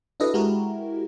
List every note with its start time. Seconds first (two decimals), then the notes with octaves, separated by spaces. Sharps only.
0.20 D4 E4 F#4 A4 B4 D#5
0.34 G#3 E4 F#4 G4 A#4